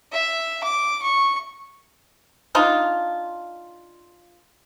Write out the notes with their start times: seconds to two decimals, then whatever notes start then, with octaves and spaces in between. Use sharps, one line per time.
0.12 E5
0.64 D6
1.02 C#6
2.55 D4 D#4 F4